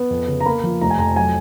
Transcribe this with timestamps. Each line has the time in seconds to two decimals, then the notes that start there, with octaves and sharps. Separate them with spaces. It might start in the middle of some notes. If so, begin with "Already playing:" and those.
Already playing: B3
0.10 F2
0.28 C#3
0.40 A#5
0.46 A#3 B5
0.63 F3
0.81 F1 A#5
0.90 G#5
0.99 F2 A#5
1.16 F#3 G#5